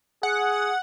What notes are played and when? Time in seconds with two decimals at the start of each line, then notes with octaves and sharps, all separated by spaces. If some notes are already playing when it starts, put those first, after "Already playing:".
0.23 G#4 F#5